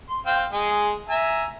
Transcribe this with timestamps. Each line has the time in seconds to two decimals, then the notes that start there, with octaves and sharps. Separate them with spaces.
0.10 C6
0.26 C4 F5 G5
0.52 G#3 G#4
1.09 E5 G#5 A#5